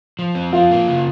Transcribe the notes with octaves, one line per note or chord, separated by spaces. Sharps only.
F3
C4
F3 F4
A#3
C#3